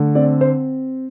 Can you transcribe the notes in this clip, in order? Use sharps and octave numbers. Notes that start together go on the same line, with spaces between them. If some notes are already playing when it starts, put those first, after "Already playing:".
Already playing: D3 A3
C4 D5
C5